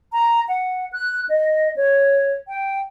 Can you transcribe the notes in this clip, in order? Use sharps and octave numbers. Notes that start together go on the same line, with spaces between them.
A#5
F#5
F#6
D#5
C#5
G5